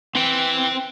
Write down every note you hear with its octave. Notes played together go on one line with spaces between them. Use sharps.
E3 C4 G5